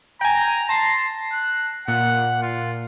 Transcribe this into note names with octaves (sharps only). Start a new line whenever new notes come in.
G5 G#5 A#5
A5 C6 A#6 C7
F#6
A#2 F#5
F4